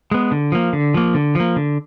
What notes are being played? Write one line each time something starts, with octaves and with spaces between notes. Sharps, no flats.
G#3 B3
D3
F3 A#3
D3
F3 A#3
D3
F3 A#3
D3